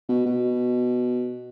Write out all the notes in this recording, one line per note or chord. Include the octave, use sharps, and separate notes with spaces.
B2
B2